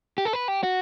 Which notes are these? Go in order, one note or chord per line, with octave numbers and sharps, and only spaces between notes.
G4
A4
B4
G4
F#4